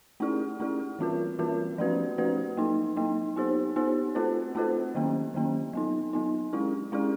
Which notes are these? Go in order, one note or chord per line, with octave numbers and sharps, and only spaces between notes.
A3 C#4 E4 G#4
A3 C#4 E4 G#4
E3 G3 C4 F4 A#4
E3 G3 C4 F4 A#4
F3 A3 C#4 F#4 B4
F3 A3 C#4 F#4 B4
F#3 A#3 D#4
F#3 A#3 D#4
B3 D#4 G4 C5
B3 D#4 G4 C5
A3 C4 F4 A4 C5
A3 C4 F4 A4 C5
D#3 F#3 A#3 C#4
D#3 F#3 A#3 C#4
F#3 B3 D#4
F#3 B3 D#4
G#3 C#4 E4 G#4
G#3 C#4 E4 G#4